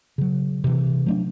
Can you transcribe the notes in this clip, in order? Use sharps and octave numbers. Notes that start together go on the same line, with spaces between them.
C#3 F#3
C3 E3
F#3 A3 D4